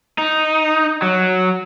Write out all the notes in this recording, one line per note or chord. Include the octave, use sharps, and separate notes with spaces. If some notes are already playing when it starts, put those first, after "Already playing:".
D#4
F#3